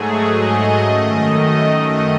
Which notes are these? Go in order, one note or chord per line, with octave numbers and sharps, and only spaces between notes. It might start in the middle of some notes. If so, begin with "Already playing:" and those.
Already playing: G#2 F#3 A3 G#4
D#5
F#2 D#3 A3